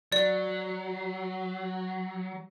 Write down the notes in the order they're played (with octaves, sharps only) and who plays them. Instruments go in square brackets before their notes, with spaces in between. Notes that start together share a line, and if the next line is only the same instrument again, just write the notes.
[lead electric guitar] F#3 [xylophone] D5